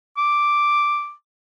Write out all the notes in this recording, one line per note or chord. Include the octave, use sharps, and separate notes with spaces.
D6